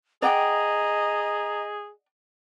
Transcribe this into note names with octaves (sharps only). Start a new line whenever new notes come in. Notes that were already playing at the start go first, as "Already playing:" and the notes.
G#4 D5 D#5 F#5 G5 A#5